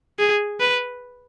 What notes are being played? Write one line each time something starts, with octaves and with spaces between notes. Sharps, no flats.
G#4
B4